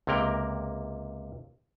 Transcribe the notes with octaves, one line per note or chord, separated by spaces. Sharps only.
C#2 C3 A#3 A#4 G5